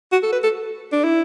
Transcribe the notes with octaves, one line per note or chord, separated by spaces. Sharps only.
F#4
A4
B4
A4
D4
E4